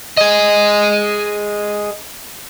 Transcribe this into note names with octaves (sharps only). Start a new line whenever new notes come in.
G#4 D#5